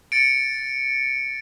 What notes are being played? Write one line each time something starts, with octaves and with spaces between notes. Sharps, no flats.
A6 C#7 D7